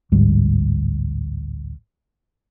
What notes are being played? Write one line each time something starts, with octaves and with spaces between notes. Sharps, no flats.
A1 D2 G#2 G3